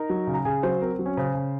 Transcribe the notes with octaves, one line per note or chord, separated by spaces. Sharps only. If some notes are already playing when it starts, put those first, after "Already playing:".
Already playing: D#4 A#4 A#5
F#3
C#3
A#5
C#3 G#4 G#5
F#3 C5
C4 A#4
F#3
C#4 C#5
C#3 C5
C#3